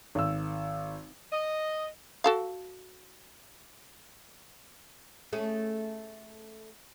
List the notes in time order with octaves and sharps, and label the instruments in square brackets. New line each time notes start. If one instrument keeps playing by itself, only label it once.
[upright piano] G#1 E6
[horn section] D#5
[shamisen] F#4 A4 F5
[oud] A3 C#4 G#4